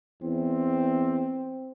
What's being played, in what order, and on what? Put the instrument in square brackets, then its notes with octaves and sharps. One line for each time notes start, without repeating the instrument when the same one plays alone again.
[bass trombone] E2 [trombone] C4